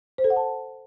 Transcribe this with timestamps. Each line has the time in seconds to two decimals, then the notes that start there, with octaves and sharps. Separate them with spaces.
0.18 C5
0.24 A4
0.30 F#5
0.36 A5